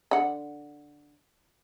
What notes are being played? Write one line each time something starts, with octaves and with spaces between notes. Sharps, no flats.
D3 F#5